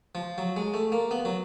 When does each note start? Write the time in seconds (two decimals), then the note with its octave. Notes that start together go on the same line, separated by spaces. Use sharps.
0.15 F3
0.38 F#3
0.57 G#3
0.74 A3
0.92 A#3
1.11 B3
1.25 F#3